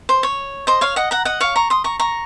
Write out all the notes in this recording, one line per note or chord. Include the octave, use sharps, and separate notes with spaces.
C5
C#5
C5 D#5
C#5 F5
D#5 F#5
F#5 A#5
D#5 F#5
C#5 F5
A#5 C#6
C6 D#6
A#5 C#6
A#5 C#6